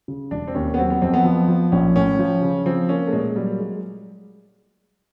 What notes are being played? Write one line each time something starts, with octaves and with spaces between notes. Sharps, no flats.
C#3
E1 D4
C4
D#2 C#4
B3
F#3 C4
B3
F2 C4
B3
F3
F3
A#1 C#4
A2 C#4
F3
C#3
F3 C4
A#3 C#4
A3
A#2 G#3
F#3 G3
G#3